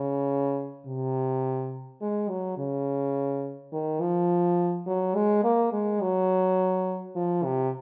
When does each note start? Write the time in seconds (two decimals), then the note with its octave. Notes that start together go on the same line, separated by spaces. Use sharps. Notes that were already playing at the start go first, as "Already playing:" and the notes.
Already playing: C#3
0.86 C3
2.01 G#3
2.29 F#3
2.57 C#3
3.72 D#3
4.01 F3
4.87 F#3
5.15 G#3
5.43 A#3
5.72 G#3
6.01 F#3
7.16 F3
7.44 C3